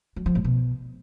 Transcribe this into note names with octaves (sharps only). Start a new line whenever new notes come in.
F#3
F3
A2
B2